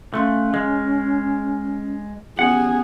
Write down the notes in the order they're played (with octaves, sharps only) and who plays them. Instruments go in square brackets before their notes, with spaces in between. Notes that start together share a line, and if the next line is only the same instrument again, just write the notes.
[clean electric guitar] A3 [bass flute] C#4 [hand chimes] F5 C6 F#6
[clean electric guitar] G#3 [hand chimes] F6
[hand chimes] B3 C#4 G4 [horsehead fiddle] G#4 [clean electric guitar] F#5